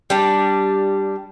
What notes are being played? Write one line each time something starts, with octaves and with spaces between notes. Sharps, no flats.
G3 D4